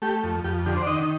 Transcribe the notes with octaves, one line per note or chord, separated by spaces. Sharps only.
A3 G4
F2
F2 G4
D3 G4
C5
D5
D#3 D#5